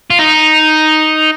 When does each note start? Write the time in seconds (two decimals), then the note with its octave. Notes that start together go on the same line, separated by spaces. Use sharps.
0.10 F4
0.19 D#4